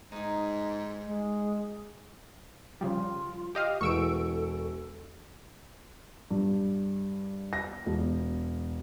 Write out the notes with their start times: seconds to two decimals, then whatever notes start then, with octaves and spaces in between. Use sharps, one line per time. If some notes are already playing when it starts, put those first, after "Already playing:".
0.12 G#2 D#4 G#4
1.06 G#3
2.81 C#3 F3 G3 F4
3.55 G4 D#5 F5
3.81 E1 E3 A4 C#6 E6 D7
6.31 G2
7.53 A#6
7.86 E1